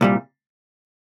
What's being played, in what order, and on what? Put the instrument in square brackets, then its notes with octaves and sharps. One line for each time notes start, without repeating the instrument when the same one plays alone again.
[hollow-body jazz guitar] C2 A#2 G3